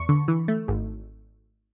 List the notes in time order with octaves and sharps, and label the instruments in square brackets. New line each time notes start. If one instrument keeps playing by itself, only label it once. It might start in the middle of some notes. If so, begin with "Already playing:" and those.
Already playing: [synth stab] E2 C#6
D3
E3
A3
G#1